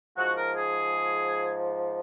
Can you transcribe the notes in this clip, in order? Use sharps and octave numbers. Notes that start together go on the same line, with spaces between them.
G#2 F3 F#4
A#4
G#4